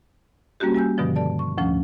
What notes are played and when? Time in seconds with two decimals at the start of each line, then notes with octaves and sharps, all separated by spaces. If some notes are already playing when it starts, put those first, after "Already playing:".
0.60 G3 A#3 C#4 F#4 G4
0.74 G3 G#5 E6 G6
0.98 G2 B2 D3 D#3 F3 G3
1.16 A4 D5 A5
1.39 C#6
1.58 D2 A2 F3 A3 C#4